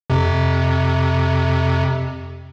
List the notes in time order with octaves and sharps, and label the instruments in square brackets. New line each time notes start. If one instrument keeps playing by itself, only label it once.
[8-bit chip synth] F2 C3